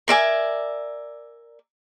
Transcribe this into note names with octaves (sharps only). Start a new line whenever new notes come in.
A#4 D5 E5 G#5